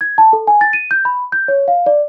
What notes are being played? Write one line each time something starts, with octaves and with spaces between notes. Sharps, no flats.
G#6
A5
A4
G#5
A6
D#7
G6
B5
G6
C#5
F5
D5